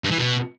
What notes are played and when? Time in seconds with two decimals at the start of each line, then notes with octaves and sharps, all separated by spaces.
0.04 G2
0.11 E3
0.18 B2